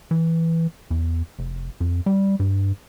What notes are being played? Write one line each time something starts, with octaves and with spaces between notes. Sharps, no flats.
E3
E2
F1
F2
G3
G2